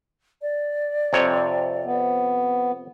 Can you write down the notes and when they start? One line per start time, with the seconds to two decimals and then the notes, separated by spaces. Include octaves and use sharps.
0.42 D5
1.13 F2 C3 C#5
1.85 B3